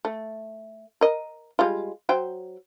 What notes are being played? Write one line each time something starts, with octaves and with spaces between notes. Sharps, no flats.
A3
A#4 D#5
G3 G#3 F4
F#3 C5 G5